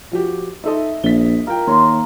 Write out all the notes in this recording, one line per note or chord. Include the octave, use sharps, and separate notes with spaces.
F3 F#4 G4
D#4 A4 D#5 E5
A#1 B6 G7
F4 A#4 G5
D#2 A#3 A#4 C#5 C6